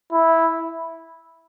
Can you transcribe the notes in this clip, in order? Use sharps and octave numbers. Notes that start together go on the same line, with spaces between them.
E4